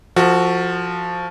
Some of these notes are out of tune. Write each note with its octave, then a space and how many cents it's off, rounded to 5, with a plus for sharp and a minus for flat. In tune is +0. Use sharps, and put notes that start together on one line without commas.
F3 +0 F#4 +0 A4 +40